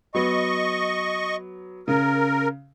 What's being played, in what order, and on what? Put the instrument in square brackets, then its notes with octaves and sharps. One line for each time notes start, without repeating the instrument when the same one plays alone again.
[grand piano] F#3 B3 [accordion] D#5 C#6
[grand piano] C#3 [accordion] A#4